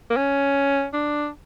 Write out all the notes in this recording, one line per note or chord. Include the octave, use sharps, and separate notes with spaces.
A#3
C#4
D4